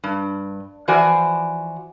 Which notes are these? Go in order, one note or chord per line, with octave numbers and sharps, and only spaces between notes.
G2
E3 F3 F#4 C5 D5 G#5